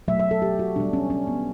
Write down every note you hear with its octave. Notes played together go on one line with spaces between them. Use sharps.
B2 F#3 A3 E5
E5
A4
G4
F#4
B2 G3 D4
C#4
C#4
B3